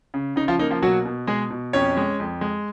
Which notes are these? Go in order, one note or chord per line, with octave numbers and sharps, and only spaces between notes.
C#3
C#3 D#4
F3 F4
A#3 D#4
F3 F4
B2 F#3 F#4
B2
B2 G#3 G#4
B2
F2 C#4 C#5
G#3
F2
G#3